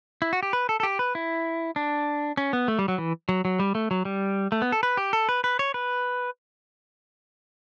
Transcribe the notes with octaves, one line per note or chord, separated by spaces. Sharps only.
E4
F#4
G4
B4
A4
A4
G4
B4
E4
D4
C#4
B3
A3
G3
F#3
E3
F#3
F#3
G3
A3
F#3
G3
A3
B3
A4
B4
G4
A4
B4
B4
C#5
B4